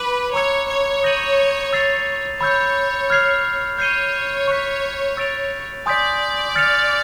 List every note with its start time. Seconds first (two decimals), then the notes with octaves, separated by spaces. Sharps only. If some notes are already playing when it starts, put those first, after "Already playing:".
Already playing: B4 B5 D6 F#6
0.33 C#5 A#5 C#6 E6 G#6 C#7
0.69 C#5
1.03 D#6 G6 A#6 D#7 F#7
1.73 E6 A6 C7 F7
2.40 C#5 B5 E6 G6
3.10 F6 G#6 C7 F7
3.78 C#5 G6 C7 D#7 G7
4.48 C#6 F#6 B6
5.17 E6 A6 D7 F7
5.86 D5 G#5 C6 D#6 G6 B6
6.55 F6 A6 C#7 F7